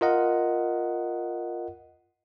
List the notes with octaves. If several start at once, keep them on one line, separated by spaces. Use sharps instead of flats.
F4 A#4 D#5 F#5